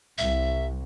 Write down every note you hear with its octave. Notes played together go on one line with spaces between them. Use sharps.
C2 E5